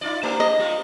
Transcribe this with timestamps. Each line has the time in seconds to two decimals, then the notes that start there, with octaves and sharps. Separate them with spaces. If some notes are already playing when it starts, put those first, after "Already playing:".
0.01 D#4 F4 D5
0.23 A3 A#3 G4
0.40 D#5
0.58 G3 F4